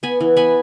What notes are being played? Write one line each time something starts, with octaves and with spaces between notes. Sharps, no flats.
B3 G#5 B5
E3
B3 G#5 B5